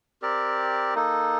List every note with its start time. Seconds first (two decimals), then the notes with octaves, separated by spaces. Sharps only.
0.22 C4 G4 A#4 D5
0.95 A#3 D#4 A4